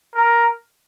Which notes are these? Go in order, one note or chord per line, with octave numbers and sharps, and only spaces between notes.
A#4